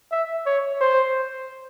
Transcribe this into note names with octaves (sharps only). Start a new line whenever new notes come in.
E5
C#5
C5